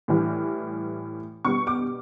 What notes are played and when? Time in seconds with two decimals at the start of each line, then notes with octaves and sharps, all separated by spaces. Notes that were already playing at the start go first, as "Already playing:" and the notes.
0.08 A2 E3 G3
1.45 B2 G3 C#6
1.67 D6